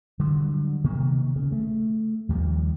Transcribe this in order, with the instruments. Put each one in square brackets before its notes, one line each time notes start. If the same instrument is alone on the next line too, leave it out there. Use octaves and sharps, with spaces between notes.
[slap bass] D3 F#3 G3
C3 D#3 A#3 B3
C#3
A3
D#2 D#3 F3 G3